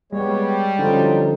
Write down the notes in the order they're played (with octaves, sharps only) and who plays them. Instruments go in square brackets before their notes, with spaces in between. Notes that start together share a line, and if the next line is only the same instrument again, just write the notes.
[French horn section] G3 [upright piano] G#3 [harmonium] B3 C#5
[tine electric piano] D3 F3 [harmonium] F#3 D#4 F4 [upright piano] C#4